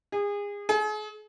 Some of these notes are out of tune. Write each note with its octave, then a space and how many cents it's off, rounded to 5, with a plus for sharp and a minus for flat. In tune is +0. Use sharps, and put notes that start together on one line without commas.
G#4 -30
G#4 +40